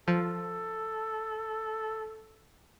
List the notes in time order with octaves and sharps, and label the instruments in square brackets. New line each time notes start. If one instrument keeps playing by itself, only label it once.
[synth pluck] F3 [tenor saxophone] A4